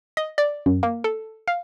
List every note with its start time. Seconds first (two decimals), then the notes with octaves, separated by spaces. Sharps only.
0.17 D#5
0.38 D5
0.66 F#2
0.83 A#3
1.04 A4
1.48 F5